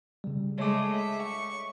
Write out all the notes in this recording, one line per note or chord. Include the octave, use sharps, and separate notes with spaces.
C#3 G3
G#3 A3 G#4 C#5 D6
E5
C#6